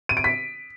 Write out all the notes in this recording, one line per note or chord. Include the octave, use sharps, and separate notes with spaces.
D#7
D7
B6